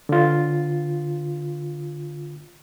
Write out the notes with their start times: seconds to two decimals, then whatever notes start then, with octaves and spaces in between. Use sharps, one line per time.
0.09 D3 F4